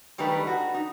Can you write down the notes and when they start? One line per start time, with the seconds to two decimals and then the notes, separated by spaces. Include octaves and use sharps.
0.18 D#3 G3 A3 D#4 B4
0.47 F#4
0.74 D#4